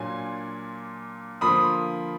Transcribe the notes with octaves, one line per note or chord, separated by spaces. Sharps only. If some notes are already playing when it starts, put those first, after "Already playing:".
Already playing: A#2 F#3 D4 F4 G#5
D3 F3 A#3 F4 B5 D#6